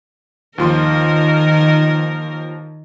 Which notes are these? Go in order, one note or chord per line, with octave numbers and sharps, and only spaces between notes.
D#2 D#3 F3 A#4 C6